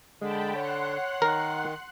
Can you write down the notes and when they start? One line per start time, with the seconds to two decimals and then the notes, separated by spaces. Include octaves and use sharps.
0.21 D3 G#3 G5 A5 B5
0.55 C#5 F#5 C6 F#6
1.22 D#3 A#4